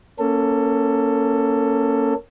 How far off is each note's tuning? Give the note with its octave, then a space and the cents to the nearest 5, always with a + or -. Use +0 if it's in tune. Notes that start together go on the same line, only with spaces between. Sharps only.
A#3 +0 C#4 +0 A4 +15